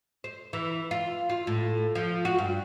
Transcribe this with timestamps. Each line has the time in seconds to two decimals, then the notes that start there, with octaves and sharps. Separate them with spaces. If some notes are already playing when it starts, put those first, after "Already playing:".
0.24 C5
0.53 E3
0.91 F4
1.30 F4
1.47 A2
1.95 F3
2.25 F#4
2.38 G2